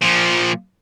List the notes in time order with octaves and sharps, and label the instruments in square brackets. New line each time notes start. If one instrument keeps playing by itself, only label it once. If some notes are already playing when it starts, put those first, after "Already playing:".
[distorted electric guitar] A#2 F3